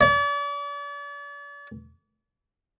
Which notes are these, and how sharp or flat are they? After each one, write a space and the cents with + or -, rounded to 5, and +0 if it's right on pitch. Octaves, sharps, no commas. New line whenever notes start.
D5 -40